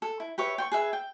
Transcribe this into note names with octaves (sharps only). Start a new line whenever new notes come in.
A4
E4
G4 B4 C#5 E5
G5 C6 C#6
G#4 B4 E5
G5